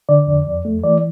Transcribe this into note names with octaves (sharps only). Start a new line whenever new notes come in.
D3 D5
F2
F2
A3
E3 D5